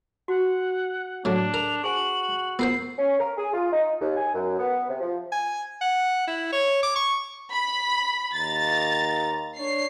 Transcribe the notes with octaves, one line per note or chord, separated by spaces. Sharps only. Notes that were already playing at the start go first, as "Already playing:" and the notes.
F#4 F#5
A2 F#3 D4
A#4 F7
F#4 G#4 C5 G#5 F#7
B3 F4 A#4 C5 E6 C7
C#4
A#4
G#4
F4
D#4
D#2
G#5
F#2
B3
C3
F3
G#5
F#5
E4
C#5
D6
C#6
B5
D#2 A#5 A6
D4 C#5 C7